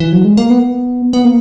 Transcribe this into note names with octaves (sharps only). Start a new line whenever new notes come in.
E3
F#3
G#3
A#3
B3
B3
A#3